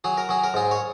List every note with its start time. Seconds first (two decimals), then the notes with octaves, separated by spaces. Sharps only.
0.04 F#3 G#4
0.17 A#4
0.29 F#3 G#4
0.44 A#4
0.54 G#2 G#4
0.71 C#5